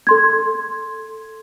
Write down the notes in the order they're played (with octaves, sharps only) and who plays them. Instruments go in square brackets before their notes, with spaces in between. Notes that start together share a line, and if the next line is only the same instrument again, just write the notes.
[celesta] A4 C6 G#6